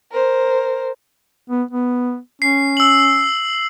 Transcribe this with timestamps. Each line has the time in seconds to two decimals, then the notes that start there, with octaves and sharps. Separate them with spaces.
0.12 A#4 C5
1.50 B3
1.71 B3
2.42 C#4 C7
2.77 E6 F#7